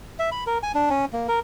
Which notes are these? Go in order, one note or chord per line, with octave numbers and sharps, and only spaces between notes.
E5
B5
A#4
G#5
D4
C#4
A#3
A#4